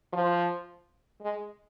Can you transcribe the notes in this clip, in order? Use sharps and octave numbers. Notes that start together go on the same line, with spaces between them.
F3
G#3